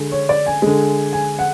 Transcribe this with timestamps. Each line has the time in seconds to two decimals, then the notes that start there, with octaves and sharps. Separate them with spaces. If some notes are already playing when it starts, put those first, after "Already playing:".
Already playing: D3 G#3
0.12 C#5
0.29 D5
0.46 G#5
0.62 D3 G#3
1.13 G#5
1.39 F#5